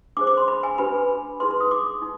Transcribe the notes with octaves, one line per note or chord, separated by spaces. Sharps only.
D4 G#4 C5 D6
D6
C6
B5
G#5
D4 G4 B4 B5
D#4 G#4 B4 C6
C6
D#6
D6
D#4